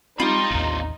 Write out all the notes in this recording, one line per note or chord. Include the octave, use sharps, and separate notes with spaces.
C4 D#4 F4 G4 B5
A1 D#2 C4 D4